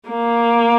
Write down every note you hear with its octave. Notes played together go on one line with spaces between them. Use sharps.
A#3